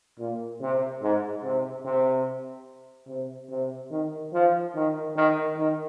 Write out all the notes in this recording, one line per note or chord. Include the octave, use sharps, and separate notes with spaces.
A#2
C3
G#2
C3
C3
C3
C3
D#3
F3
D#3
D#3
D#3